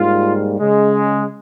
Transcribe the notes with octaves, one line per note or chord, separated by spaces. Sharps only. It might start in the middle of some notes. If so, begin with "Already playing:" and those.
Already playing: G#2 G3 A#3 F4
C#3 G#3